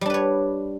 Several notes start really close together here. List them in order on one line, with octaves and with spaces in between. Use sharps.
G3 D4 B4 C#5